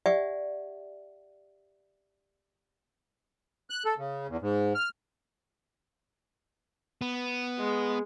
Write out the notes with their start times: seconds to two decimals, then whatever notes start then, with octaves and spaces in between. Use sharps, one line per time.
0.06 G4 D5 E5 F#5 G#5
3.70 F#6
3.85 A4
3.98 C#3
4.28 E2
4.41 G#2
4.75 F6
7.01 B3
7.59 G#3